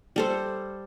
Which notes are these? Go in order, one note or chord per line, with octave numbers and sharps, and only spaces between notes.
G3 A4 C5